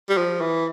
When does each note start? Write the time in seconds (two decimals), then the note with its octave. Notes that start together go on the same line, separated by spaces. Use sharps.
0.09 G3
0.17 F3
0.41 E3